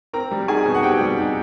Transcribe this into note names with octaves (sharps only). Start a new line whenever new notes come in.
C4 A#4 A#5
G3
D#4 G#4 G#5
B2
F#5
C4 G4 G5
G3
D#4